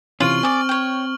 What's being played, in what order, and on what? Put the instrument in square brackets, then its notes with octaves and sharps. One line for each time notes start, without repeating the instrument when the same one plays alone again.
[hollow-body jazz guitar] C3 E3 C#4 [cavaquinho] F4 [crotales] C#6 F6 F#7
[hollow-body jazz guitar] C4 [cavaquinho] G#4 D5
[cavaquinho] C#5 G5